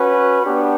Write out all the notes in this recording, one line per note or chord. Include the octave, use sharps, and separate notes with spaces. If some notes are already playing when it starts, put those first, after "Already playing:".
Already playing: C#4 F#4 B4
B3 D4 G4